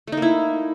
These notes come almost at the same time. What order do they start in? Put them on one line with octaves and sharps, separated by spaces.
A3 D#4 A#3 E4